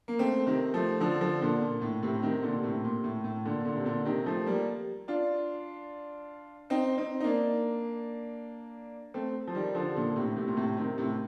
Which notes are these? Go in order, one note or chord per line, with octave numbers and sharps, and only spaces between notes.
A#3
A3 C4
C3 D#3
F3 A3
D3 F3
D3 F3
A#2 D3
A#2
A2
A2 C3
C3 D#3
A#2 D3
A2 C3
A#2
A2
A2
A#2 D3
A#2 D3
C3
A#2 D3
C3 D#3
F3 A3
G3 A#3
D4 F4
C4 D#4
C4 D#4
D#4
A#3 D4
A3 C4
F3
D#3 G3
D3 F3
A#2 D3
A2 C3
A2 C3
A#2
A2 C3
C3 D#3
A2 C3